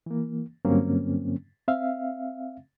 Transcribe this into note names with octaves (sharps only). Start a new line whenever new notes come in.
E3 A#3
G2 D3 F#3 A#3 C4 C#4
C4 E5 F5